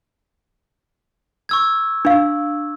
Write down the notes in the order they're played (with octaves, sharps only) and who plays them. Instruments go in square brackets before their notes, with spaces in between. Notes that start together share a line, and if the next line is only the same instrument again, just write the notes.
[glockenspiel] C#6 E6 G#6
[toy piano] D4 F5